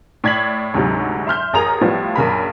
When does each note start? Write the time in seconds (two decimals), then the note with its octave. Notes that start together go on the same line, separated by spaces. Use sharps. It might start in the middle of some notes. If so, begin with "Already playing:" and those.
0.24 A2 D5 G#6 B6 F#7
0.74 D2 G#2 C3 F#3
1.27 E5 C6 F6 G6
1.53 A1 G#4 A#4 A#5 D#6 F7
1.81 A2 F3 G3 B3 F4
2.16 A#1 F#2 C#3 A#4 B5